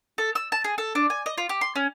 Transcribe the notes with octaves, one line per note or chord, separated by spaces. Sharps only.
A4
E6
A5
G#4
A4
D4
G#5
D#5
F4
G4
C6
C#4